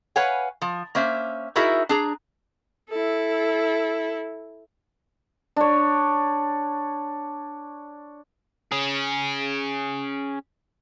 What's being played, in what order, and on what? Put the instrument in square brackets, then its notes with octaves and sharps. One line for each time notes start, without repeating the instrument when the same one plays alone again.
[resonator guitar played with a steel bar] B4 C#5 F5 F#5 G#5
F3
A#3 C#4 C5 E5
D#4 E4 F#4 G#4 A#4 E5
D4 G#4 A#5
[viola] E4 A4
[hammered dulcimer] D4 C#5
[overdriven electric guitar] C#4 G#4